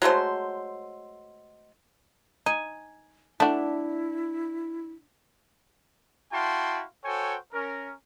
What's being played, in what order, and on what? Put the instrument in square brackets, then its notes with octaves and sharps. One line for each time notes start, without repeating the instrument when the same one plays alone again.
[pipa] F#3 G#3 A3 C5
[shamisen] D#4 [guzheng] G#5
[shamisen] A3 F#4 [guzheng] D4 [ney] E4
[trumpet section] E4 F#4 F5 G5 A5 C6
F#4 A4 C5 C#5 G5 G#5
C#4 A#4